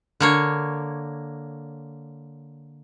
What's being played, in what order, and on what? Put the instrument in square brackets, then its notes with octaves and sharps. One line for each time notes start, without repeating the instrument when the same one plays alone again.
[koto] D3 A#3 C#5